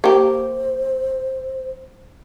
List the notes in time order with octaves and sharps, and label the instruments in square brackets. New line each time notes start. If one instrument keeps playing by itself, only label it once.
[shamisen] A#3 G4 [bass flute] C5